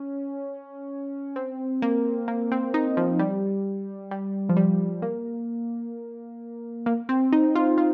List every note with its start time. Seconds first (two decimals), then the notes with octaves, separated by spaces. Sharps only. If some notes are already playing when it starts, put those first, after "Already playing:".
Already playing: C#4
1.36 C4
1.82 A#3
2.28 A#3
2.52 C4
2.74 D#4
2.97 F3
3.19 G3
4.11 G3
4.49 F3
4.57 G3
5.02 A#3
6.86 A#3
7.09 C4
7.33 D#4
7.55 F4
7.78 F4